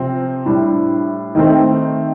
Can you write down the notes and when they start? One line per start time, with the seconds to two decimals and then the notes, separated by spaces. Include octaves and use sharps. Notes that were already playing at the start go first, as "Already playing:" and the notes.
Already playing: C3 F3 C4
0.46 A2 G3 D4
1.35 D#3 A3 C4